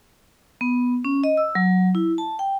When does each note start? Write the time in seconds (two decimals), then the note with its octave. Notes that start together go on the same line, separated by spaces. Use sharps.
0.61 B3
1.05 C#4
1.24 D#5
1.37 E6
1.55 F#3
1.95 E4
2.18 A5
2.39 G5